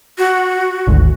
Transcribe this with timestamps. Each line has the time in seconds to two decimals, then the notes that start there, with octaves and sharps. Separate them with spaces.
0.18 F#4
0.87 G#1 D2